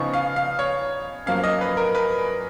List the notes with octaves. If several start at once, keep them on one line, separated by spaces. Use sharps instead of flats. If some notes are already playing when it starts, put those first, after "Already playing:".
Already playing: C#3 F3 B3 D#4 C#6
F5
F5
C#5
F#2 F3 A#3 C#4 F5
D#5
B4
A#4
B4